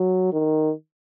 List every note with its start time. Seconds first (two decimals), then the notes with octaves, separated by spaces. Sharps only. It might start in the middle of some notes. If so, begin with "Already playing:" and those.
Already playing: F#3
0.33 D#3